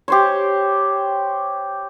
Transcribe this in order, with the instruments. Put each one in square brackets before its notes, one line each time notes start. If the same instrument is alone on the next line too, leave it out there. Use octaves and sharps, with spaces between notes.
[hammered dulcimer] G4 C5 C#5